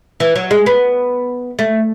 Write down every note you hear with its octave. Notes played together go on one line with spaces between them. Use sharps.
E3
F#3
G#3
B3
A3